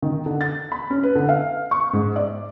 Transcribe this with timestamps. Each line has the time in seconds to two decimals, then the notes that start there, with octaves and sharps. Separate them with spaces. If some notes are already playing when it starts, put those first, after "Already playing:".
0.02 D#3
0.26 D3
0.41 A6
0.72 B5
0.90 C#4
1.03 B4
1.15 D3
1.29 F5
1.71 C#6
1.93 G#2
2.16 D5